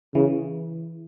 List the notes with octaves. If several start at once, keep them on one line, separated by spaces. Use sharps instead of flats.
C#3 E3